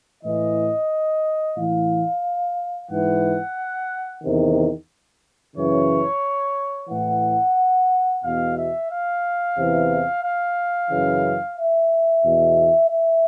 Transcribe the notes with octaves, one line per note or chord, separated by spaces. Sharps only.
A2 E3 D#5
A2 E3 F5
G#2 E3 F#5
E2 C3 D#3
F#2 C#3 E3 C#5
A2 E3 F#5
E2 B2 F5
E5
F5
E2 C3 E3
F5
F#2 C#3 E3
E5
E2 B2
E5